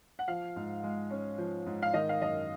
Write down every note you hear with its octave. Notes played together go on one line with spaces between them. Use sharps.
F#5
F3 F5
G#2
G#3
C#4
F3
G#2
F5
D#3 D#5
F5
F#2 D#5